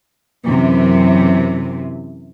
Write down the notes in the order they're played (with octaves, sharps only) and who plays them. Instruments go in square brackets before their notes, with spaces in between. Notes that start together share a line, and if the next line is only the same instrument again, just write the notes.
[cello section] F#2 C3 E3